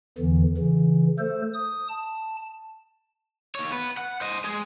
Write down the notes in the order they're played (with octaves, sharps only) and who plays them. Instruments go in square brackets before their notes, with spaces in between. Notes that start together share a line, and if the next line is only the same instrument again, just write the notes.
[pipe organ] E2 D3 E3
C#3 E3
A3 A4 C5
D#6
A5
[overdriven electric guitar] D#2 C#5
B3 B4
F#5
C5 D#5
G#3 G#4